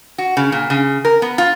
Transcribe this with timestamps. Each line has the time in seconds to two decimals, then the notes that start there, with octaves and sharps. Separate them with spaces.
0.18 F#4
0.37 C#3
0.52 A#2
0.70 C#3
1.05 A#4
1.22 B3
1.38 F4